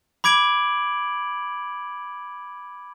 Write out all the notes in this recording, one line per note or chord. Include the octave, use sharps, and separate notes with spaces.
B5 D6 G#6 D7 F#7